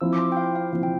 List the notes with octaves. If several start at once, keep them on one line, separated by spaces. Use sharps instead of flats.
F3 C4 E4 E6
D6
C6
G5
F5
F5
F3 C4 E4
G5